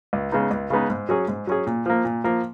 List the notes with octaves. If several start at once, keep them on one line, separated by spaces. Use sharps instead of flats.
C#2
C#3 G#3 B3 D#4
C#2
C#3 G#3 B3 D#4
G#2
F#3 C#4 G#4
G#2
F#3 C#4 G#4
A#2
F3 A#3
A#2
F3 A#3